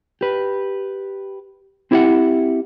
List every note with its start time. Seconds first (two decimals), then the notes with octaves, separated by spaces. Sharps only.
0.21 G4 B4
1.91 C4 E4 G4 C#5 E5 F#5